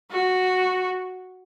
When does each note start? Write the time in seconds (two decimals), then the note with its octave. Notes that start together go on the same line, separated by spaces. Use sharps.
0.11 F#4